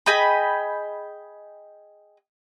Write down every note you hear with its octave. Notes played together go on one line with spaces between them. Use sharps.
G#4 D#5 G5 B5